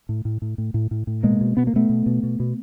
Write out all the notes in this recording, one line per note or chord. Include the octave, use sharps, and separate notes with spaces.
A2
A2
A2
A2
A2
A2
A2
B2 G#3 A#3
B2
B2 B3
A#3
B2 A3 B3
B2
B2
B2
B2